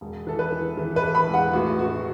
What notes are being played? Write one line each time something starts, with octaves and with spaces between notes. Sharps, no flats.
E1
E3 A4
B4
E3
E3
B4
E3
B5
E1
F#5
A1 F#4
A2 F#4